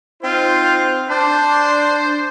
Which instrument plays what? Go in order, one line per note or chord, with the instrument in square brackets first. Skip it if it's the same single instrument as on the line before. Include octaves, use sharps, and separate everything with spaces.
[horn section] C4 D#4 C5 [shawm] F4
[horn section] D4 [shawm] C5